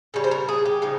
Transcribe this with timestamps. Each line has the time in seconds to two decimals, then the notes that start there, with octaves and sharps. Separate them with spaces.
0.14 C#3 G3 C#5
0.24 C5
0.31 A#4
0.49 G#4
0.65 G4
0.82 C#3 F3 D#4